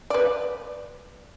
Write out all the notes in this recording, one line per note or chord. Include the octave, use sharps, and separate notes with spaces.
B4 D5